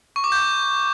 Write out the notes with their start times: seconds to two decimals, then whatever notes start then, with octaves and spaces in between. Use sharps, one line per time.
0.16 C#6
0.24 D6
0.32 G6